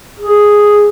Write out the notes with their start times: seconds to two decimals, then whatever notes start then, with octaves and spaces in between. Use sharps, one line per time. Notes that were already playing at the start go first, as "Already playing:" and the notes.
0.19 G#4